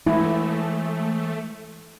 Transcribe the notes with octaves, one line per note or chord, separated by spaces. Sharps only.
E3 G#3 A3 E4